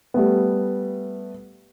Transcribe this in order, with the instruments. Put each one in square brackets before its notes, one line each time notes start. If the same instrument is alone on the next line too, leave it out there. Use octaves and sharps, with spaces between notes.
[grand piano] G3 A3 B3